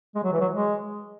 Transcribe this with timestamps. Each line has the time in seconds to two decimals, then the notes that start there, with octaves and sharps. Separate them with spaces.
0.15 G#3
0.24 F#3
0.33 E3
0.41 F#3
0.53 G#3